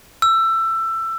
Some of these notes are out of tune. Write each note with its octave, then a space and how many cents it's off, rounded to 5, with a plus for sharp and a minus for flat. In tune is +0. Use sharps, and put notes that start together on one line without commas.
E6 +20